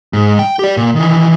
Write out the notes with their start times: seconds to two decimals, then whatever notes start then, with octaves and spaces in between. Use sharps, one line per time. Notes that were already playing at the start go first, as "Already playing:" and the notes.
0.13 G#2
0.39 G5
0.59 G4 D5
0.77 A#2
0.95 D#3 E3